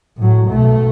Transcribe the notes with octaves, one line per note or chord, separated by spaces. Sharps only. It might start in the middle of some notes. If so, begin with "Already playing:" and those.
A2 F#3
B1 A3